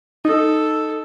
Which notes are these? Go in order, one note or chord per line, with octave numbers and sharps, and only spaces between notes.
D#4 A4